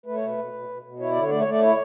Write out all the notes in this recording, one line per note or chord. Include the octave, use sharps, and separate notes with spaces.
A3 B4
C#5
B2 B4
B2
B2
B2
B2
E4 C#5
D5
D3 C#5
A3 D5
C#5
A3 D5
E4 C#5